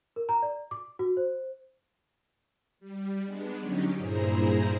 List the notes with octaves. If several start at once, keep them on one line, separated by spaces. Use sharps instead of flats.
A#4
A#5
D5
D6
F#4
C5
G3
G#3 B3 D4
D3 F#3 C#4 D#4 G4
G2 A#2 E4 G#4 C5 A#5